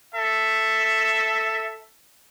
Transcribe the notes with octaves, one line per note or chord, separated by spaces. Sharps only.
A4 E5